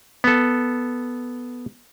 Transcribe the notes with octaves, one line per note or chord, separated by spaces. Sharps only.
B3 A4